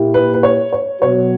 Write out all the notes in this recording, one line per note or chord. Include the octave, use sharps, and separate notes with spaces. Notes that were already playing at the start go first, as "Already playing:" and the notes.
Already playing: A#2 A#3 E4 G4
B4
B4
C#5
C#5
B2 F#3 B3 F#4 C#5